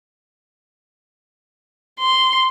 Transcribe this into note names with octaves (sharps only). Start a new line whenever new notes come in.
C6